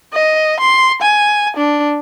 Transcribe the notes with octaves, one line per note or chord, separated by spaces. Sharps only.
D#5
C6
G#5
D4